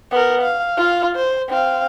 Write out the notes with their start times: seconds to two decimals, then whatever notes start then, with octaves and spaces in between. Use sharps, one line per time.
0.11 B3 A#4
0.42 F5
0.77 F4 F5
1.15 C5
1.49 C4 F5